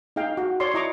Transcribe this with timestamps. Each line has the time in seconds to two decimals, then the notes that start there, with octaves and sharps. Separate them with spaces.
0.16 D#4 G#4 F5 G5
0.37 F#4
0.60 C#5 D5 C6
0.74 E4 D#5 A#5 C#6 D6